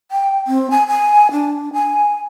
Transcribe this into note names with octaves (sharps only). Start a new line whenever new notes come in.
G5
C4
G#5
G#5
D4
G#5